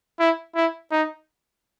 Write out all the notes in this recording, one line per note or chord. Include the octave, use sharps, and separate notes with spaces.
E4
E4
D#4